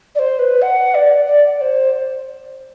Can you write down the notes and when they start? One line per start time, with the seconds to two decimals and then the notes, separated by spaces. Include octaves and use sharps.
0.15 D5
0.18 C5
0.38 B4
0.61 F#5
0.94 D5
1.25 D5
1.56 D5
1.61 C5